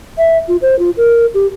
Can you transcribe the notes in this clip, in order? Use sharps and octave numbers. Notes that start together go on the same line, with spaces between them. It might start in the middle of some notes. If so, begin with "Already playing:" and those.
E5
F4
C5
F4
A#4
G4